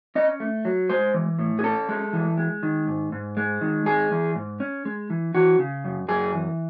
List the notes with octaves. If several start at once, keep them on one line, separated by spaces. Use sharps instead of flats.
C#4 D#5
A3
F#3
G#3 C5
E3
A2
G#4
C#4 A4
G#3
E3
G#3
D#3
G#2
G#2
G#3
D#3
G#3 G#4
E3
G#2
C#4
G#3
E3
E3 F#4
C#3
F#2
F#2 G#4
E3